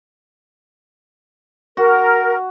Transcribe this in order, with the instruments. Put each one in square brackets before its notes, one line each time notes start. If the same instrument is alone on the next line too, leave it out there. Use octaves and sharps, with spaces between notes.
[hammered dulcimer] F#4 [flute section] A#4